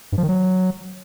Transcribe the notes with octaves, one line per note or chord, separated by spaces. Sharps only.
G2
F3
D#3
F#3